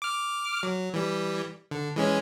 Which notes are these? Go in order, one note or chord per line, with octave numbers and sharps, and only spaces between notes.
D6 F6
F#3
E3 G3
D3
E3 G#3 C#4